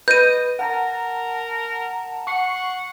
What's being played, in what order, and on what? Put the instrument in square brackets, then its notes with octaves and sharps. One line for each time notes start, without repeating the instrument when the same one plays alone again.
[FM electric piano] B4 [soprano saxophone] D#5 [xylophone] G6 D#7
[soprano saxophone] A#4 [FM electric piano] F#5 A5 A#5
[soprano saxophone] F#5 [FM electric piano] C#6 C7